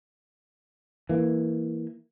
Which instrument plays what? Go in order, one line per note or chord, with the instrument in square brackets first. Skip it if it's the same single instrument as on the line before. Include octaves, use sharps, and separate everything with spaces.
[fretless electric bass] E3 A#3